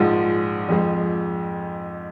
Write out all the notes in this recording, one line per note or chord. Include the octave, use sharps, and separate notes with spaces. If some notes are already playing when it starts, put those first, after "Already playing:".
Already playing: A#1 G#2 F3 G#3
F2 F3 G#3